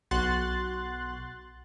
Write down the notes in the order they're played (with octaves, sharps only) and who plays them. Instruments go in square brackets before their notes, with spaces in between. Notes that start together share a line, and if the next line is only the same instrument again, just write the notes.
[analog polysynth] B1 F#4 C6 F#6 A6